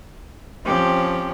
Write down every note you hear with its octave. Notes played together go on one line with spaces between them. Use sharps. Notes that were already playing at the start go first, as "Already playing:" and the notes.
F3 C4 C#4 G4